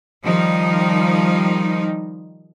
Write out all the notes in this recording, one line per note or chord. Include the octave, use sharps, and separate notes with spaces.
D#3 F3 G3 D#4